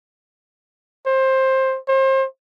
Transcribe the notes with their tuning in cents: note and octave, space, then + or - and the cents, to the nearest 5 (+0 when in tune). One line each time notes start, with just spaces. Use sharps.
C5 +15
C5 +35